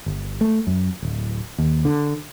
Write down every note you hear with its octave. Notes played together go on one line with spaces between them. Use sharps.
G1
A3
F#2
D1
D#2
D3